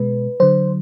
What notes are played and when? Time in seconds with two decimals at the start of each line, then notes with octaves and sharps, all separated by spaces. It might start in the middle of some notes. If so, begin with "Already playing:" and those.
Already playing: B2 G#3 B4
0.40 D3 F#3 C5